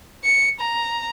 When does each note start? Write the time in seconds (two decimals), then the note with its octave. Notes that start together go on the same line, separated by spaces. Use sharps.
0.24 C#7
0.61 A#5